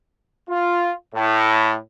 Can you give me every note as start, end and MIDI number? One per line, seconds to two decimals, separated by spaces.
0.49 0.92 65
1.14 1.77 45